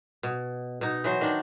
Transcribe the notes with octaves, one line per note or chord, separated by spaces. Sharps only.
B2
B2 D#4
E3 F#3 C5
D#3 D4